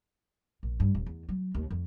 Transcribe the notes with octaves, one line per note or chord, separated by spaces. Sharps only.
A#1
G2
D#1
E2
F#3
D#2
F2